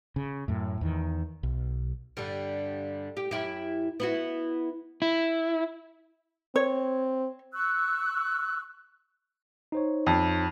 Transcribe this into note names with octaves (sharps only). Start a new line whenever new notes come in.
C#3
F#2 A2
E2 D#3
B1
G2 D3 G3
G4
F#2 E4 G4
B3 E4 F#4
E4
C4 C#5
C#6 E6 F#6
D#4 C5 C#5
F2